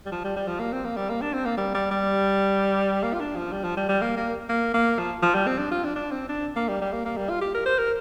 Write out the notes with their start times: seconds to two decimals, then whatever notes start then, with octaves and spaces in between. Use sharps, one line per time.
0.06 G3
0.12 F3
0.24 G3
0.36 G3
0.48 F3
0.60 A#3
0.73 C4
0.85 A#3
0.96 G3
1.09 A#3
1.21 D4
1.34 C4
1.45 A#3
1.57 G3
1.74 G3
1.91 G3
3.03 A#3
3.14 F4
3.20 D4
3.36 F3
3.52 G3
3.64 F3
3.77 G3
3.89 G3
4.02 A#3
4.17 A#3
4.49 A#3
4.74 A#3
4.99 F3
5.22 F3
5.35 G3
5.47 C4
5.59 D4
5.71 F4
5.84 D4
5.96 D4
6.11 C4
6.29 D4
6.56 A#3
6.68 G3
6.81 G3
6.92 A#3
7.05 A#3
7.17 G3
7.30 F4
7.41 G4
7.54 A#4
7.66 C5
7.78 A#4